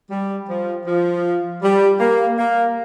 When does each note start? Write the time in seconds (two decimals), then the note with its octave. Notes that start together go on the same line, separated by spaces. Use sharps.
0.10 G3
0.49 F3
0.86 F3
1.62 G3
2.00 A#3
2.38 A#3